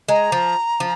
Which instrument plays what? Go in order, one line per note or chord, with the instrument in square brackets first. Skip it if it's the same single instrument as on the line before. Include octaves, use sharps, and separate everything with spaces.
[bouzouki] G#3 [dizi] A#5
[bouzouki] F3
F3